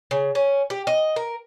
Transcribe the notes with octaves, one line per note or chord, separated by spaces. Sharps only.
C#3
C#4
G4
D#5
A#4